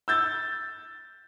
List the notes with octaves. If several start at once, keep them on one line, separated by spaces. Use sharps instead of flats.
E6 G6 A6